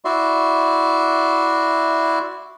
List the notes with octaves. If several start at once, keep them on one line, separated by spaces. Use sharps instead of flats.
E4 F#4 D5 E5 C6